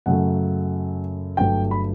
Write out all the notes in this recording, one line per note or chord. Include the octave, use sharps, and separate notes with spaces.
F#2 C#3 F#3 A3 F#5
G1 G2 F#3 A3 G5
B5